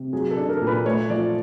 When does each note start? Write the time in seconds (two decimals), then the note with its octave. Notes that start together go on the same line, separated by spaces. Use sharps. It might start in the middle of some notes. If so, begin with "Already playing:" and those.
Already playing: C3
0.13 F#3 G#4
0.31 A4
0.37 D4
0.49 A#4
0.61 A#2
0.67 B4
0.85 A3 C#5
1.10 F3 D5